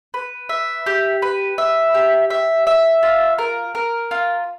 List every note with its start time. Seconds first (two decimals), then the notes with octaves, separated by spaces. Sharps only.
0.14 B4
0.49 E5
0.86 G4
1.22 B4
1.58 E5
1.94 G4
2.30 E5
2.67 E5
3.03 F4
3.38 A#4
3.75 A#4
4.11 F4